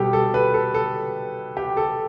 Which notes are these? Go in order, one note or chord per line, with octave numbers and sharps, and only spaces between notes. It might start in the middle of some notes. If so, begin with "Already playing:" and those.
Already playing: B2 G3 G4 A4
A4
B4
A4
A4
G4
A4